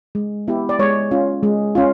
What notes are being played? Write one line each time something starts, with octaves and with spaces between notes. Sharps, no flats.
G#3
B3 E4 G4
D5
G#3 C#5
C#4 F4
G#3
C#4 F4